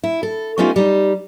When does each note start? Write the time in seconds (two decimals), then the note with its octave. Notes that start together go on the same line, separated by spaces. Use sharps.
0.03 E4
0.23 A4
0.58 A3 B3 C#4 D#4 F4 G4
0.76 G3 D#4